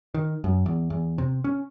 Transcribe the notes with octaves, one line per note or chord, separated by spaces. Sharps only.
D#3
F#2
E2
E2
C3
C#4